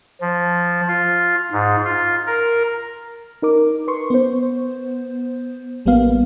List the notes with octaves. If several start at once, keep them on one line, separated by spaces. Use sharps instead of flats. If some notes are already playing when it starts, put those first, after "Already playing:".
F3
F4
G#2
F4
A#4
D#4 A#4 D6
B4 C6 C#6
B3 C5
A1 G3 A#3 B3 F5